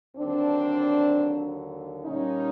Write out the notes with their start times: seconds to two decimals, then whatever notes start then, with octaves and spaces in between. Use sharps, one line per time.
0.16 D#2 D3 F#3 C4 D4
2.04 A#2 G3 C#4 D#4